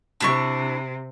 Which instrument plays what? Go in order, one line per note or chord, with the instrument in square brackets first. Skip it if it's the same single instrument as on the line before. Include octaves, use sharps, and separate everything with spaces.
[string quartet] C3 [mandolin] D4 E4 C#6